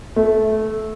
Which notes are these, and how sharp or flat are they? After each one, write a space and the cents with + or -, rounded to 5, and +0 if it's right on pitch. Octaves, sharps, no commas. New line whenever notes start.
A3 -15